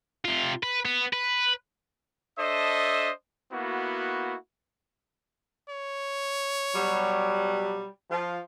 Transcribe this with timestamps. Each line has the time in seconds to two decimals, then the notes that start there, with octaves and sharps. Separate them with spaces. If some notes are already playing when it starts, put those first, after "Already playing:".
0.25 C3 F4
0.63 B4
0.85 B3
1.13 B4
2.38 D4 A4 C5 D#5 E5 D#6
3.52 A#3 B3 E4 F#4
5.69 C#5
6.76 B2 F#3 G3
8.11 F3 F4